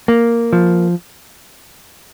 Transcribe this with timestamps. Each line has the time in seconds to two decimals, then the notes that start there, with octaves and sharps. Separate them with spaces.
0.08 A#3
0.53 F3